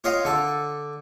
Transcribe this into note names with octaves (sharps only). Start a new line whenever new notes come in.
F4 C#5 D#5 F5 G5
D3 A4